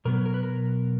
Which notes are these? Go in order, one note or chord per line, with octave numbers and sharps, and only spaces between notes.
B2 F#3 B3 A#4
A#4
B4
A#4